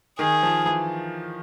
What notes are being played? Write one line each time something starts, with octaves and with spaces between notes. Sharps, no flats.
D#3 G#4
F3
E3